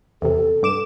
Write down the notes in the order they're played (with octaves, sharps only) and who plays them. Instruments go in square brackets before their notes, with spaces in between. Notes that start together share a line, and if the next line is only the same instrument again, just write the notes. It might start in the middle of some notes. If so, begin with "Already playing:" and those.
[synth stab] E2 C3 [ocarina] A4
[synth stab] G2 D6 E7